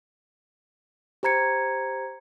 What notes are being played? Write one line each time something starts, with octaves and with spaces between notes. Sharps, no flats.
G4 C5 A#5 G#6 C#7